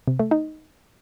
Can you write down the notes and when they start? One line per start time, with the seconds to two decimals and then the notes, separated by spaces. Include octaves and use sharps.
0.08 C3
0.19 A3
0.31 D#4